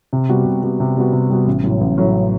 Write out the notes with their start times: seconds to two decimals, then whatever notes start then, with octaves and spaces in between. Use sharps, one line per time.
0.13 C3
0.29 G3 B3 F#4
0.46 C3
0.63 G3 B3 F#4
0.80 C3
0.97 G3 B3 F#4
1.13 C3
1.30 G3 B3 F#4
1.47 A1
1.64 A2 F#3
1.81 A1
1.98 A2 F#3